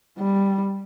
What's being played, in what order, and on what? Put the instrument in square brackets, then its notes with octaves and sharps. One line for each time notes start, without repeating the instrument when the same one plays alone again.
[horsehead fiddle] G3